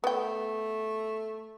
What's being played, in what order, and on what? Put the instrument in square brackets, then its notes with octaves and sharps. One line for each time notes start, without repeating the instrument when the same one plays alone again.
[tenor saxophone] A3 [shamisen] B3 G5